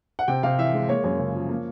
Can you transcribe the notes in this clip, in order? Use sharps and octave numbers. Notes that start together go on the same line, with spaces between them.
F#5
C3 G5
C3 F5
E3 E5
G#3
A#3 C#5
F#2 C#5
C#3
F3
A#3